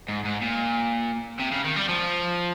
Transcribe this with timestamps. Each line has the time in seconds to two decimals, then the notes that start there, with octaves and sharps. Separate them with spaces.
0.09 G#2
0.25 G#2
0.41 A#2
1.39 C3
1.52 C#3
1.64 D#3
1.76 G3
1.89 F3